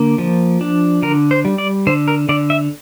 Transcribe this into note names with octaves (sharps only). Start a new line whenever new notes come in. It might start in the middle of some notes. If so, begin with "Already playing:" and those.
Already playing: D3 A#3
F3
D4
D3 A#4
C5
G3
D5
D3 C5
A#4
D3 D5
E5